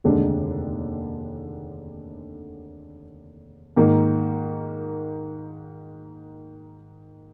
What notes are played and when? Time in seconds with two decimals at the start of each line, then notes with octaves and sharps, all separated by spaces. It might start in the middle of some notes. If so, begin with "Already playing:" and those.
0.04 F1 D#2 D3 G#3 D4
3.76 G#2 D#3 A#3